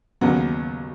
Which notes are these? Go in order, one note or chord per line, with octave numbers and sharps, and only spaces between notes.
D#2 C#3 F#3 B3